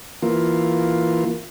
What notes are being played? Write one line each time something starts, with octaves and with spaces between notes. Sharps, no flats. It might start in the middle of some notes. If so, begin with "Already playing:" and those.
E3 A#3 F4